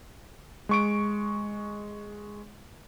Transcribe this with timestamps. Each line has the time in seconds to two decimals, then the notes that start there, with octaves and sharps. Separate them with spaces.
0.69 G#3 C#6 D7